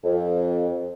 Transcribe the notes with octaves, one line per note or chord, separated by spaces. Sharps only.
F2